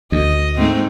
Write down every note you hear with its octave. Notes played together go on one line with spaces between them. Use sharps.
D2 D#5
G#2 A3 C4